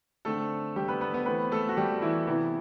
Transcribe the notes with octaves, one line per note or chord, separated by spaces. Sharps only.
D3 A3 C4 A4
G3 G4
B3 B4
B3 B4
B3 B4
E3 A3 B3 C4 B4
A3 A4
F#4
G3 G4
E3 E4
C3 E3 B3 E4